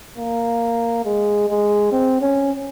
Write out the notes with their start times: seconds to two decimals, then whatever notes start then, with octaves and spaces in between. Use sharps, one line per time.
0.17 A#3
1.05 G#3
1.49 G#3
1.92 C4
2.21 C#4